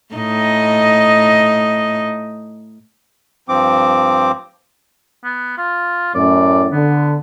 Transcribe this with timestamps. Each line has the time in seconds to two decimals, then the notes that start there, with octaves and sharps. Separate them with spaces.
0.14 A2 D#4 D#5
3.49 G2 F3 C4 D6
5.24 B3
5.58 F4
6.14 F#2 A2 D5
6.71 D3 B3